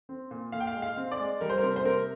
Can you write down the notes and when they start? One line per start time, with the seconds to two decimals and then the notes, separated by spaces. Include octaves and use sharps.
0.09 C4
0.31 A#2
0.52 A#2 F5
0.60 G5
0.67 F5
0.75 G#3
0.82 F5
0.97 C4
1.12 D5
1.19 G#3
1.41 G3 A#4
1.50 C5
1.58 A#4
1.63 C3
1.76 C5
1.85 C3 A#4